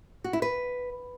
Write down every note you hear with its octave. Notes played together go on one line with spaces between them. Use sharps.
F#4
E4
B4